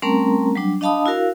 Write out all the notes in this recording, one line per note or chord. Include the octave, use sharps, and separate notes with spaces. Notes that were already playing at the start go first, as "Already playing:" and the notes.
G3 A3 C4 C#4 A#4 A#5
F#3 G3 D4
D4 D#5 F5 A5 B5 D#6
E4 F#4 A#4 F5